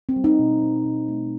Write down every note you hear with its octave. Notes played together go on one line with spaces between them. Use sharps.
C4
G3
D#4
B2
G3
B2
A3